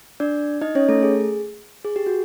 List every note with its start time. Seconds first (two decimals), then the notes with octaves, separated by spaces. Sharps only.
0.20 D4 D5
0.61 D#4 D#5
0.75 C#4 C#5
0.89 A3 A4
1.03 G#4
1.85 G#4
1.96 G4
2.06 F#4